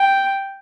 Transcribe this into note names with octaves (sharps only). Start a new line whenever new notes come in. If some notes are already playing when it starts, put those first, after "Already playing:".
Already playing: G5